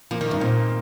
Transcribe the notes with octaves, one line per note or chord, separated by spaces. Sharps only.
F3 A#3
D#3
G2 D#4
A#2 C4